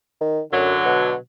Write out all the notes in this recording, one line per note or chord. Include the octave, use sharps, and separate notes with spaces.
D#3
F#2 D3 F#3
B2